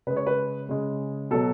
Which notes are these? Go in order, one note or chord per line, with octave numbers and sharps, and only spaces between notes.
C#3 G#3 B4
C#5
B4
C#3 G#3
B2 F#3 A4